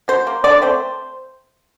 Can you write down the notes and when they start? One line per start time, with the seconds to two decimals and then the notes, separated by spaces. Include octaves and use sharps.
0.08 F#3 C5
0.27 A#3
0.44 D3 D5
0.62 A3 C4 C5